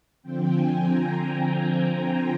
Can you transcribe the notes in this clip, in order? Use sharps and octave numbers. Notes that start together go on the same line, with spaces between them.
D3 F3 C4 G5
G#5
A#5
G5
A#5